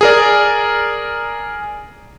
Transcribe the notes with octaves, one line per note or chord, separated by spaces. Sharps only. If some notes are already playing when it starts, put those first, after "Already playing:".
G#4 A#4 D5